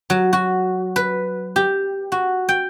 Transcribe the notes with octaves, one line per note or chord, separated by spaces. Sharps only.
F#3
F#4
B4
G4
F#4
G5